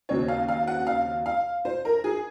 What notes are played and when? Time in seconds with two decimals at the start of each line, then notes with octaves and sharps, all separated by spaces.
0.09 D#2 C#3 F#3 C4 C#5
0.28 F5
0.48 F5
0.67 F#5
0.87 F5
1.26 F5
1.65 C5
1.85 A#4
2.04 G#4